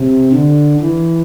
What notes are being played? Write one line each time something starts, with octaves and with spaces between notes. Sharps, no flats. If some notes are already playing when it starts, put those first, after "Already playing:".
Already playing: C3
D3
E3